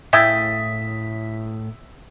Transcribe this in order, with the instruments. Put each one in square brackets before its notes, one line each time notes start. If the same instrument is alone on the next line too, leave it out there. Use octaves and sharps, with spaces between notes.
[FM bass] A2 [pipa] C#3 E4 G5 [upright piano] E5 D#6 A6 [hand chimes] B6